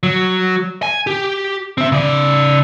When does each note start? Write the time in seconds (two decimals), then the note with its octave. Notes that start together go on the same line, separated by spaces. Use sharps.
0.03 F#3
0.83 G#5
1.07 G4
1.78 C4 E5
1.92 C#3 D5